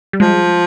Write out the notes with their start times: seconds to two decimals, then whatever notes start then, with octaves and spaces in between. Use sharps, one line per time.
0.13 G3
0.20 F3 G#3